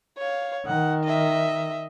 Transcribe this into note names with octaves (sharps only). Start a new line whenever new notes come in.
C#5 F5
D#3 F#5
D#5 E5